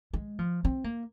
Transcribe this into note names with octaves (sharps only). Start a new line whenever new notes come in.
G#3
F3
C4
A#3